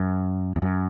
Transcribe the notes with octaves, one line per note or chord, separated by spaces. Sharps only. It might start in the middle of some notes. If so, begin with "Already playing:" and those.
Already playing: F#2
E2
F#2